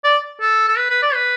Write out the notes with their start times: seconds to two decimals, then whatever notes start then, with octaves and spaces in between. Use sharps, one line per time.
0.04 D5
0.41 A4
0.68 A4
0.77 B4
0.90 B4
1.02 D5
1.14 B4